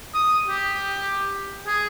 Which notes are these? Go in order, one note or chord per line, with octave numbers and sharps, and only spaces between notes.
D#6
G4
G#4